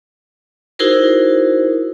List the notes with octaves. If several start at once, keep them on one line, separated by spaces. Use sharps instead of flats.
D#4 E4 F#4 G#4 A#4 C5